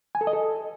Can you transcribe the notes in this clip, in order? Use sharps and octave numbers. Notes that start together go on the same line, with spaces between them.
G#5
A4
D#5
A4